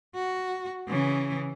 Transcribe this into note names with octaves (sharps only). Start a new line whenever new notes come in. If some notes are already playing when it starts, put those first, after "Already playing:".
F#4
C#3 E3